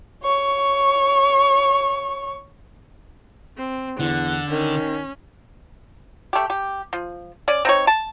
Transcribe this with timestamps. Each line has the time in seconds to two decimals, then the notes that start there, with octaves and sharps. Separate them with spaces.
0.23 C#5 C#6
3.57 C4
4.00 E2 D3 F#5
4.51 D#3 C#4
6.33 A3 G4
6.50 G4
6.93 F3
7.48 C#4 D5
7.65 C4 D#4 C#5
7.87 A5